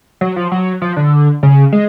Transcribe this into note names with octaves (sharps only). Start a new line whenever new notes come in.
F#3
F3
F#3
F3
D3
C#3
G#3